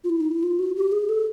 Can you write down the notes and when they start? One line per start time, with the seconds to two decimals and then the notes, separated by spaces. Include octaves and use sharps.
0.04 F4
0.09 E4
0.20 D#4
0.31 E4
0.43 F4
0.59 F#4
0.76 G4
0.92 G#4
1.09 A4